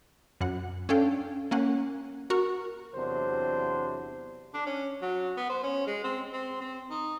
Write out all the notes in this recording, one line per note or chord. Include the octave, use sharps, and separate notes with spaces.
F#2 F#5
C#4 D4 A4 F5 G5
A#3 C#4 F#5
F#4 A#4 C#6
E2 C3 F#3 D4 C5
D4
C#4
F#3
B3
C5
C#4
G#3
C4
C4
C4
D#4